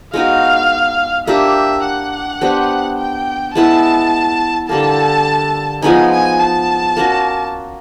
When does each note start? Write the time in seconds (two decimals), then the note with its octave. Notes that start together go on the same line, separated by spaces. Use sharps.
0.13 G#3 B3 D#4 F#4 F5
1.27 A#3 D4 G4 E5
1.84 F#5
2.41 B3 D4 G4 C5
2.98 G5
3.55 G#3 B3 E4 A5
4.68 D3 G3 A#3 A5
5.82 F3 G#3 B3 D#4 G#5
6.12 G#5
6.40 A5
6.97 A#3 C#4 F#4 A#4